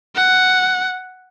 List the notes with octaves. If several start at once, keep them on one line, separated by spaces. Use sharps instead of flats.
F#5